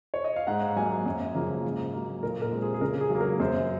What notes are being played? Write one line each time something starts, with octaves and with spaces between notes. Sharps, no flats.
C#5
D#5
F5
G#2 F#5
F#3 A#3 G#5
F#2
C#3 F3 A#3
G#2
F#3 A#3
A#2 A#4
A#4
G#3 C4
G#4
G#4
C#3 A#4
G#4
F#3 A#3
A#4
F#2 C5